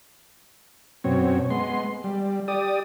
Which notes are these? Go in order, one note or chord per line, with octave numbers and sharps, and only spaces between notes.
F#2 B2 C4 C#5
G#3 B3 C6
G3
G4 D5 D#6